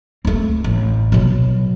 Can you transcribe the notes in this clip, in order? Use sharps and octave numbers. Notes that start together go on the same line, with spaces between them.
A3 C4
A1
B2 F#3